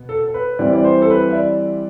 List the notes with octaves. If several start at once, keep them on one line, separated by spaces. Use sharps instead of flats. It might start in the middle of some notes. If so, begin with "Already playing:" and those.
Already playing: B2 B3
A4
A4
B4
E3 G3 C4 D5
D5
C5
A4
B4
E5
D5